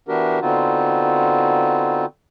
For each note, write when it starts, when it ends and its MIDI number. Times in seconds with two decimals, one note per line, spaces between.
0.08 0.39 52
0.08 0.39 59
0.08 0.39 62
0.08 0.39 66
0.08 0.39 67
0.08 0.39 70
0.42 2.05 50
0.42 2.05 59
0.42 2.05 60
0.42 2.05 63
0.42 2.05 65
0.42 2.05 66